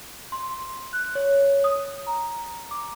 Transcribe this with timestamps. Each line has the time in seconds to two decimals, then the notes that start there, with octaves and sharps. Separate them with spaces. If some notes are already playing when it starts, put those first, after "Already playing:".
0.32 C6
0.93 F#6
1.15 C#5
1.64 D#6
2.07 A#5
2.71 D6